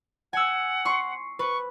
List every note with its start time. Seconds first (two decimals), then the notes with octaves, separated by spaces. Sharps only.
0.33 F#5 G#5 E6
0.85 C6 C#6
1.39 B4 C#6